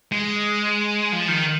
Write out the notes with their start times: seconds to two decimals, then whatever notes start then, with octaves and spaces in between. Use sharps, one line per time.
0.12 G#3
1.13 F3
1.28 D#3